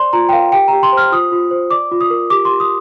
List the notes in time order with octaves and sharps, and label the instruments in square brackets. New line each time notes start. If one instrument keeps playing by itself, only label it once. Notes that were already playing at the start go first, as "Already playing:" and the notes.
Already playing: [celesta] C5 D5 C6
F4 A#5
G5
A#4 F5
G4 G5
G4 A#5
C6
C5
F6
F4 D#6
F4
C5
D5 D6
F4
D#6
A#4
G4 D6
G4 C6
D#6